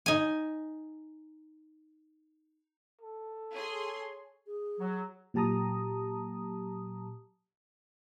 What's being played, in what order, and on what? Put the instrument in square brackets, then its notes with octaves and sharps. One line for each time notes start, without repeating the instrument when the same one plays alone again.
[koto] D#4 G#5
[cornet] A4
[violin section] G#4 C6 [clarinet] C#5
[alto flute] G#4
[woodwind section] F#3
[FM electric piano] A#2 F#3 G4 A5 A#5 D#6